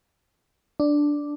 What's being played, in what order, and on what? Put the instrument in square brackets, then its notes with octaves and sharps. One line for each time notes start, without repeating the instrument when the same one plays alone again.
[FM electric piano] D4